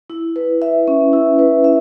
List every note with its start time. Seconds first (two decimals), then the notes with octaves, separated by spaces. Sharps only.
0.10 E4
0.36 B4
0.62 E5
0.88 C#4
1.13 E4
1.39 B4
1.64 E5